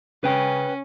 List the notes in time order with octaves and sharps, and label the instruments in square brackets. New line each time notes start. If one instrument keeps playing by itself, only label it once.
[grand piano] C#3 [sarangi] C#4 [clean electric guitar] B4 G5